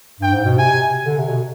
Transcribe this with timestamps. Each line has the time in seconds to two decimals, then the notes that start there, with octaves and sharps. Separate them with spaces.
0.20 G2 G5
0.32 G#2
0.45 B2
0.58 C3 G#5
1.05 D3
1.18 C3
1.29 B2